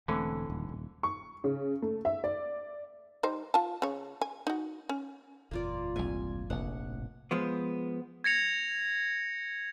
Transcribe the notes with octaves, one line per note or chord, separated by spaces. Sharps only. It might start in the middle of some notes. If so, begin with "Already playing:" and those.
E1 D3 E3 A3 C4 C#4
D#1
D#1
C#6
C#3
A3
E5
D5
G3 D#4 C5
F4 A5
C#3 C#5
G#5
D#4 F#4
C#4
F#1 E2 A#2 A#3 F4 D5
C2 G#2 G#5
F1 A#1 F#5
A2
F3 G#3 B3
G#6 A#6 C#7 F7